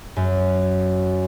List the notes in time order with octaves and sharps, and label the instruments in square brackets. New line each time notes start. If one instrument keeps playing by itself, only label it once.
[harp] F#2